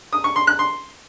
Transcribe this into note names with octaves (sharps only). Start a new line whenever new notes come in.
D#6
C#6
C6
F#6
C6